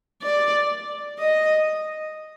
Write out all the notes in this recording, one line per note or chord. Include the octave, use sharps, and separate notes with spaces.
D5
D#5